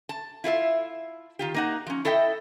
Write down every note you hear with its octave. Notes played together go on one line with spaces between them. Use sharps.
A5
E4 F4 A#4 E5
D#3 F4 G4
A#3 D#4 F#5
F3 C#4
E4 A4 D#5 E5 G5